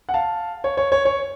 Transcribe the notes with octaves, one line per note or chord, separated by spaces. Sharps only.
F#5
F5 A5
C#5
C#5
C#5
C#5